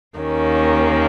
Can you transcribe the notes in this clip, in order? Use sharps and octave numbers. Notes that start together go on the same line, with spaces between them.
D#2 D#3 A#3 C#4